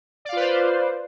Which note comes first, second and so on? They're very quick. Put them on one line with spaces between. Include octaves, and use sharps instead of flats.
D5 F5 F4 B4 C5